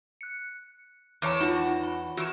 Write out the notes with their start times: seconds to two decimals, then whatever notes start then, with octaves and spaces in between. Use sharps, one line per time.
0.21 F#6 C#7
1.22 E2 C#5 A5 D6
1.41 D#4 F4 F#4 F#5
1.83 B5
2.17 E2 E4 F#4 C#6 E7